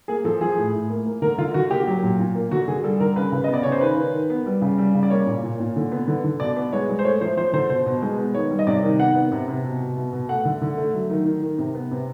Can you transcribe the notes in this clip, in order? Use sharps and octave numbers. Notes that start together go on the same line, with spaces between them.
A#3 G#4
F3 A4
F3 G#4
A2
A2
A#3
A#3
D3 A#4
D3 F4
D3 F#4
A#3 G4
F#3
A#2
A#2
A#3
D3 F#4
D3 G#4
G3 A4
D3 A#4
C#3 B4
C#3
D#5
B3
D5
C#3 C#5
C5
D#3 B4
D#3
D#3
B3
G3
C#3
G3
C#3
D5
A#3 C#5
A#2
A#2
A#2
D3
B3
D3
D3
B2 D5
B3
G#3 C#5
G#3
C5
A3 C#5
F3 C5
F3 C5
D3 C5
B2 C5
B2
G#3
B3
D#3 C#5
G3
D#5
C3 D5
D#3
B3 F#5
B3
C3
C3
B2
B2
B2
B2
A3 F#5
D3
D3
A3
F#3
D#3
D#3
D#3
C3
B3
C3